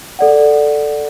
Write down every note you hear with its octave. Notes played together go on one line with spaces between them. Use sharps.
A4 D5 F#5